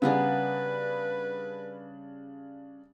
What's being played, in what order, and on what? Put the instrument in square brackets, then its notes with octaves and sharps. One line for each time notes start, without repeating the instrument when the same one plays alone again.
[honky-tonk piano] C#3 G3 D4 [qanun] A#3 B3 G#4 [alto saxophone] B4